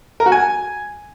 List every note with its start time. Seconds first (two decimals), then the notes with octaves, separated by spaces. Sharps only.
0.20 A#4
0.26 F#4
0.32 G#5